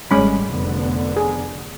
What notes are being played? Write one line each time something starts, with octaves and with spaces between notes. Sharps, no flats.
G#1 A2 G3 G#3 C#4 B5
F1 D3 B3
G#4